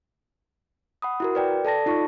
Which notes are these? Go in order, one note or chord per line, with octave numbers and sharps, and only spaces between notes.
F#5 B5 D#6
E4 F#4 A#4
B4 D5 G5
A4 D5 A5 A#6
D#4 F4 A5 C#6